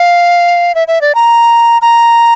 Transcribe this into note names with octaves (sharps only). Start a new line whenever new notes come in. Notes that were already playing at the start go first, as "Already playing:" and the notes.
Already playing: F5
E5
E5
D5
A#5
A#5